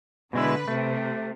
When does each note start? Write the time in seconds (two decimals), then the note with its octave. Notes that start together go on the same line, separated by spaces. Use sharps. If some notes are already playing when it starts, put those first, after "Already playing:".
0.33 B2 D3 G#3 E4 B4
0.68 C3 A3